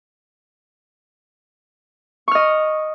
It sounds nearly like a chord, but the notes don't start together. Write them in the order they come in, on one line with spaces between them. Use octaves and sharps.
C#6 F6 D#5